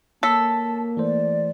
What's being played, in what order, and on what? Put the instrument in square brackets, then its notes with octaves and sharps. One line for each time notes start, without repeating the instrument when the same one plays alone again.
[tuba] A#3 [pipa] A4 [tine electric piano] C#5 B6 [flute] A5
[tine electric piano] E3 A3 C5 [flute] D5